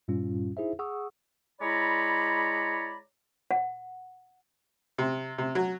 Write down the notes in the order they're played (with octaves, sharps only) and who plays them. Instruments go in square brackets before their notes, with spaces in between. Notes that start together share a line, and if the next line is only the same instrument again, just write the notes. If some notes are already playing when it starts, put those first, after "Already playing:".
[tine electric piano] G2 A#2 G3 C#4 F4
D#4 E4 G#4 C5 E5
G#4 F#5 C#6 D#6 E6
[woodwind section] G#3 E4 C#5 D5 A#5 B5
[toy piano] F#5
[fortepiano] C3
C3
F#3